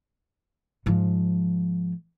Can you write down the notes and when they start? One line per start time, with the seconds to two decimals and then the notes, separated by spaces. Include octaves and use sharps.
0.86 G#2 F3